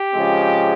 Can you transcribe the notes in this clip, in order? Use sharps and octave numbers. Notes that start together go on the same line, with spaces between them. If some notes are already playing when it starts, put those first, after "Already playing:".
Already playing: G4
C#3 F3 G#3 C4